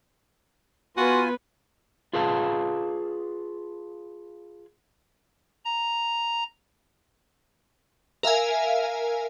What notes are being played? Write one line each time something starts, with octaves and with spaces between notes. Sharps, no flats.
B3 F4 F#4 B4 G#5
F4 G#4 B4 F5 A5
A#5
A#4 E5 F5 G#5